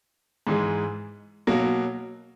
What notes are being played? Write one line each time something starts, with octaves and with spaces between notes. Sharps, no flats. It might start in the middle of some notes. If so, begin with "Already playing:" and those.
G#2 E3 G#3
B2 F#3 A#3